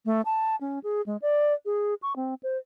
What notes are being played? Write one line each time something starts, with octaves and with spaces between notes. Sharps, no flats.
A3
A5
C#4
G#4
G#3
D5
G#4
C#6
C4
C5